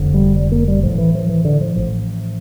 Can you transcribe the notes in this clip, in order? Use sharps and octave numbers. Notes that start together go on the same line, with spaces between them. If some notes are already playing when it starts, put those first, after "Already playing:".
Already playing: F1 F2 D3
G3
G3
A#3
G3
A1 A2 F3
E3
F3
E3
D3
F3
A1 A2 F3